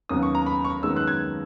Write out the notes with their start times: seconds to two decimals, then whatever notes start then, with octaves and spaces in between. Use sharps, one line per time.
0.09 D#2 C#3 F#3 B3 D#6
0.23 C#6
0.35 A#5
0.46 B5
0.65 C#6
0.83 F#2 D#3 G#3 B3 E6
0.96 F#6
1.08 G#6